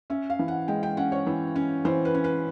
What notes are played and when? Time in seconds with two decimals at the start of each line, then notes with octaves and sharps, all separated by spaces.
0.10 C#4 E5
0.30 F5
0.39 E3
0.48 F#5
0.68 G#3 G5
0.83 G5
0.97 C#4 F#5
1.12 C#5
1.27 E3
1.56 C#4
1.85 E3 C5
2.05 B4
2.14 C#4
2.24 B4